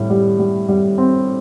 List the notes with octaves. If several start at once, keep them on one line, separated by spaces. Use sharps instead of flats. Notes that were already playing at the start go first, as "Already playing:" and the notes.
Already playing: A2 G3
G3
G3
G3
C4